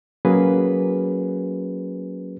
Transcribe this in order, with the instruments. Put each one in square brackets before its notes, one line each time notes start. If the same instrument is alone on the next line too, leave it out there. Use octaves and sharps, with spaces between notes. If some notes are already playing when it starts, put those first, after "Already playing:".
[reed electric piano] F#3 A#3 C#4 F#4 G#4 B4